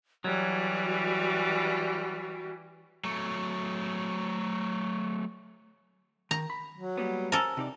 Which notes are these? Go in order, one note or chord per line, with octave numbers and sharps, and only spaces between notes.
E3 F#3 G3 F#4
F#3 A3
D#3 A#5
B5
F#3
G3 A#3 B3
A4 A#4 C5 G#5
C3 D#4 D5